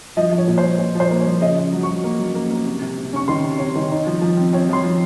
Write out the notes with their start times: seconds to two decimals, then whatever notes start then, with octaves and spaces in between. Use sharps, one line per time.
0.17 F3 D#5
0.32 F3
0.38 C#5
0.47 A#2
0.58 C5
0.63 F3
0.78 A#2 C#5
0.95 F3
1.00 C5
1.10 A#3
1.20 C#5
1.26 F3
1.41 C#3 D#5
1.56 C#3
1.72 F#3
1.83 F#3 C#6
2.04 A#3
2.19 F#3
2.35 A#3
2.50 A#3
2.66 C3
2.82 C3
2.98 C3
3.13 C#4 C#6
3.28 D#3 C6
3.44 C3
3.59 C3 C#5
3.75 D#3
3.91 D#4
4.07 F3
4.22 F3
4.37 C4
4.53 C4 C#5
4.69 F3 C6
4.83 F3